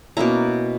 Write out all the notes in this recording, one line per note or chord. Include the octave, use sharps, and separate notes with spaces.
B2 A#3 C#4 E4 A#5